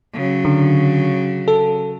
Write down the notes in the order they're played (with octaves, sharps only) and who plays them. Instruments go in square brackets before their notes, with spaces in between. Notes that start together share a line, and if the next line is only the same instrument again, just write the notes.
[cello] C#3 F#3
[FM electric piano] D3
A4